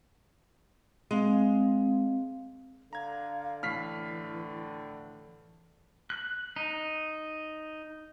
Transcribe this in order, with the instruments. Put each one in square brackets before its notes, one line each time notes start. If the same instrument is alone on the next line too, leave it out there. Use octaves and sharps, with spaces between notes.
[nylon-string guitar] G#3 [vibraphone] C4 F5
[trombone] D3 [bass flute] F5 [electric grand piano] A#5 G#6
[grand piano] A2 C7 [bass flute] E3 [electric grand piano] F6 B6
[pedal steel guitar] F#6
D#4